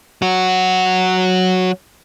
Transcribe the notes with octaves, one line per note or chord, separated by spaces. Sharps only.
F#3 F#4